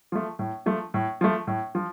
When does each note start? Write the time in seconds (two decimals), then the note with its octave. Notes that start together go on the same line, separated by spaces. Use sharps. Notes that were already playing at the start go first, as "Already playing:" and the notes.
0.12 F3 A3
0.39 A2
0.66 F3 A3
0.94 A2
1.21 F3 A3
1.47 A2
1.75 F3